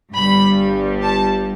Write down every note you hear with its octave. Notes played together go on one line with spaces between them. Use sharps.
G1 G2 G3 B5
A5